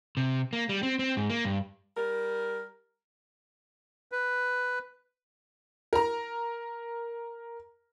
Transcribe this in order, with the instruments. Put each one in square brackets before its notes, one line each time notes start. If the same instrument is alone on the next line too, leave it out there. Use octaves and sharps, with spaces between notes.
[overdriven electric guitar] C3
A#3
G3
C4
C4
G#2
A#3
G2
[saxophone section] G3 A#4
[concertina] B4
[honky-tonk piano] A#4 A#5